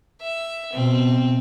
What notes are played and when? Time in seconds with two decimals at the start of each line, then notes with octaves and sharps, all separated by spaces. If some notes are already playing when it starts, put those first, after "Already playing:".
0.21 E5
0.73 B2 C4